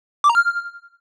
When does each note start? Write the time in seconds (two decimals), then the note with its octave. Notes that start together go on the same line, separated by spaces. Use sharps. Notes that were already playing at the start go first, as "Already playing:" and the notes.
0.24 D6
0.30 A#5
0.35 F6